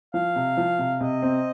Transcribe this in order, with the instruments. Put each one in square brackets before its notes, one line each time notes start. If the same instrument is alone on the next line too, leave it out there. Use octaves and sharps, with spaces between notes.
[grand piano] F3 [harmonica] F5
[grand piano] C3
F3
C3
[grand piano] C3 [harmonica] D#5
[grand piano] C4